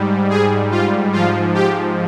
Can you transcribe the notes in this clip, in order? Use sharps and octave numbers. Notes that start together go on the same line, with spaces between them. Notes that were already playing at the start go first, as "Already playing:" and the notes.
Already playing: G#2 G3
G#4
F4
G#2 F3 F4
G4